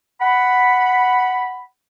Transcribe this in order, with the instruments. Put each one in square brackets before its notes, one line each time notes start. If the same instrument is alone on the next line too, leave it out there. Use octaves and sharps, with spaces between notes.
[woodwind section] F#5 B5